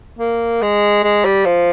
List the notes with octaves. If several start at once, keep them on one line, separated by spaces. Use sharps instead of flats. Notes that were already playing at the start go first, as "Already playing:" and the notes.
A#3
G#3
G#3
G3
F3